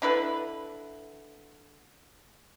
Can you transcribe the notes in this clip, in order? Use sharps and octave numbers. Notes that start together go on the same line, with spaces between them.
D3 E4 B4